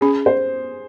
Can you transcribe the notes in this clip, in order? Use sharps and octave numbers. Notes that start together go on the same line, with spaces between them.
C#4 G#4
C5